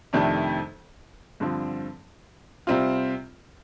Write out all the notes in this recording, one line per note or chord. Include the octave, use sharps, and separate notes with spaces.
F2 C3 D#3 A3 D4
G2 D3 F3 C4
C3 G3 C4 F4